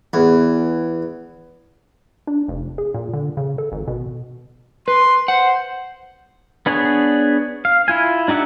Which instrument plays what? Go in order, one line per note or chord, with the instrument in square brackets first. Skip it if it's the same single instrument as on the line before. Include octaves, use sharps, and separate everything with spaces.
[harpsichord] E2
[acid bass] D4
F1
G#4
A#2
D3
C#3
A4
G#1
B2
[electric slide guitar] B4 [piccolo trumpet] C6
[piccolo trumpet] C5 [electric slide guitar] F#5
[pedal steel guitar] B3 D4 G#4 B4 C#5
F5
E4 F4 G#5
D4 D#4 G4 E5 F#5